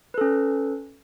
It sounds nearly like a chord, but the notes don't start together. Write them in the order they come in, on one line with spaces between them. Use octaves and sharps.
B4 A4 C#4